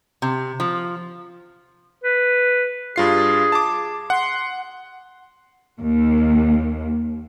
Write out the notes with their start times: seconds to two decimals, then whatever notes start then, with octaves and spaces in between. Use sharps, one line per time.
0.22 C3
0.60 F3
2.04 B4
2.96 G2 F4 G#4 C7
3.52 A5 D6
4.10 F#5 C6
5.80 D#2